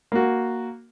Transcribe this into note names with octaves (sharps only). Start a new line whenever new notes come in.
A#3 F#4